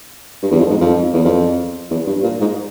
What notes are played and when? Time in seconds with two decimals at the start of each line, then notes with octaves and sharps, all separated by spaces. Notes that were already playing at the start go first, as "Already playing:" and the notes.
0.43 G2
0.51 E2
0.60 F2
0.71 G#2
0.81 F2
1.14 E2
1.25 F2
1.91 E2
2.07 G2
2.23 A#2
2.41 G#2